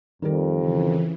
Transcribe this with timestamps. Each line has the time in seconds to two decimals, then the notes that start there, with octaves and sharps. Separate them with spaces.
0.22 F2 D#3 G3 A#4
0.55 C#3 E3